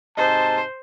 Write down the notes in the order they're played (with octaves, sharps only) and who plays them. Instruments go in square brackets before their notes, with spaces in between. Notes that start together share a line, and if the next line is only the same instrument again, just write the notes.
[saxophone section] G#2 C3 D#5 [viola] C5 [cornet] A5